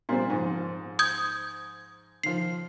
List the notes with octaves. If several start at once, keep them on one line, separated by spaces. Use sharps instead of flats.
A#2 G3 C4
G#2 F3
D#6 G6 G#6
D#3 F3 C7